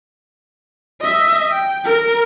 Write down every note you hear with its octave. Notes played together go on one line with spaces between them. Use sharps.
D#5 E5
G5
A#4